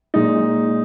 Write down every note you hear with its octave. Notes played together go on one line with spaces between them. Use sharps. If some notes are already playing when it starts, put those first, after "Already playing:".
A#2 G#3 D#4